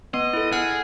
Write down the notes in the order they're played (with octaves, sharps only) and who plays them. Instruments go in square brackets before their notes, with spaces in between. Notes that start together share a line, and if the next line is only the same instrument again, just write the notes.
[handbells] B3 [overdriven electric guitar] D#5
[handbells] E4 A4
[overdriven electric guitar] G#4 [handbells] F#5 F6